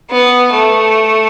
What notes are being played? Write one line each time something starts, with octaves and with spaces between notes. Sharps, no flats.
B3
A3